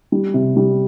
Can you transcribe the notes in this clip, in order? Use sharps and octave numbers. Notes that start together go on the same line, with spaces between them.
G3
C3
G3